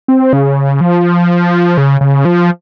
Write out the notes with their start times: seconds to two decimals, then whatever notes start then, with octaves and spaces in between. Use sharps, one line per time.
0.08 C4
0.33 C#3
0.81 F3
1.78 C#3
2.01 C#3
2.25 F3